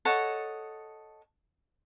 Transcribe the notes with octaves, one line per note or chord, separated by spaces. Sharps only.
A4 C#5 D#5 F#5